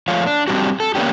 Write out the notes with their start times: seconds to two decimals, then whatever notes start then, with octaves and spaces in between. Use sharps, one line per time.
0.08 F3 A3 F4 C#5
0.27 D4
0.47 G3 C4 D4 D#4 F#4 G4
0.80 A4
0.95 A#3 B3 C#4 D4 G4